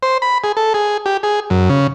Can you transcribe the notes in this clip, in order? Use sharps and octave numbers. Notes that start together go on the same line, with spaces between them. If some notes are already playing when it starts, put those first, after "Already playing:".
C5
B5
G#4
A4
G#4
G4
G#4
F#2
C#3